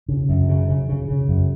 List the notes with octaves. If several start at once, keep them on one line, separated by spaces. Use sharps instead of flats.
C#3
F#2
C#3
C#3
C#3
C#3
F#2